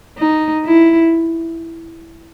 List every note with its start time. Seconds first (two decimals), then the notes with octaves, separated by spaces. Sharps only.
0.18 D#4
0.65 E4